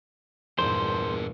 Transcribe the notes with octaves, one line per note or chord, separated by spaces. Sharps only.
E2 G2 A#2 D4 G#4 A#4 C5